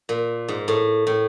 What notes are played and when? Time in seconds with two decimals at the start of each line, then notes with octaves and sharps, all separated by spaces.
0.09 A#2
0.48 G#2
0.68 A2
1.07 A2